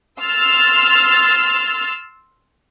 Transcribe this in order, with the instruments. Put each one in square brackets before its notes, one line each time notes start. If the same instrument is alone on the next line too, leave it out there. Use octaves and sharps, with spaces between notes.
[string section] C6 E6 F6 A6